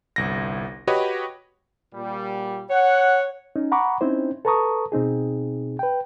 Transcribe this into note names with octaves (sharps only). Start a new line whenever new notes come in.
G1 C2 A#6
F#4 G4 B4 C#5 D#5
A#2 G3
C#5 F#5
C#4 D#4
F#5 A#5 B5 C#6 D6
C4 C#4 D#4 E4 C5
A4 B4 A5 A#5 C#6 D#6
B2 C4 D#4 G#4
B4 G5